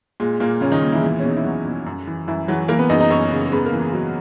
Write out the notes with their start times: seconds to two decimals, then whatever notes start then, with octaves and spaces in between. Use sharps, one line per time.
0.20 A#2 G#3
0.40 A#2 A#3
0.61 A#2 C#3 C#4
0.72 D#3 D#4
0.82 A#2
0.93 E3 E4
1.03 E2
1.20 C#4
1.24 B2 D#4
1.37 E4
1.44 E2 F#3 F#4
1.66 B2
1.86 F#2
2.07 E3
2.28 F#2 E3 E4
2.48 E3 F#3 F#4
2.68 E3 A#3 A#4
2.79 B3 B4
2.89 F#2 D#4 D#5
3.00 D#4 D#5
3.10 F#2 C#4 C#5
3.31 C#3
3.52 G#2 B3 B4
3.66 A#3 A#4
3.73 E3
3.80 G#3 G#4
3.93 G#2 F#3 F#4